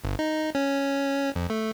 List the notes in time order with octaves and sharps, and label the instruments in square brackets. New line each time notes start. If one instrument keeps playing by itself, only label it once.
[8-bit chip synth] G1
D#4
C#4
F2
A3